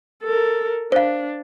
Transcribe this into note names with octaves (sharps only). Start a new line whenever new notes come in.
A4 A#4
D4 C5 F5